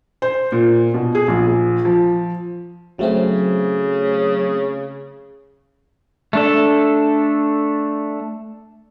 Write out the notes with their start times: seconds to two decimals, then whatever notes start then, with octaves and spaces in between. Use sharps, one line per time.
0.22 C5
0.52 A#2
0.94 B2
1.15 G#4
1.28 A#1
1.85 F3
2.99 C#3 F#3 A3 C4
6.33 A3 D4 A4